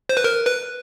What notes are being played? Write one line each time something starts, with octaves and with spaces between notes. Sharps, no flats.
C5
B4
A#4
B4